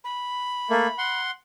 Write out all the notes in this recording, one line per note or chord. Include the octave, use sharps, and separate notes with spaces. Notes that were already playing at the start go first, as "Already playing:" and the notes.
B5
A3 A#3
F#5 C6